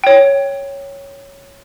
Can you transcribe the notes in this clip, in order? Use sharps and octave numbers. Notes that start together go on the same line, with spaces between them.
C#5 G5